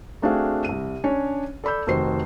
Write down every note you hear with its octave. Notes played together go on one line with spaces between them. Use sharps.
A3 C4 D4 F#4 G#4 F5
C2 D#7
C#4 D4 C#5
A4 D5 B5 E6 G6
F1 D#3 F#4 C5 C7